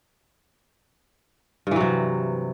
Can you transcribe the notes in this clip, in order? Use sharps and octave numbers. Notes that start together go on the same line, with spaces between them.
G2 C3 E3 F#3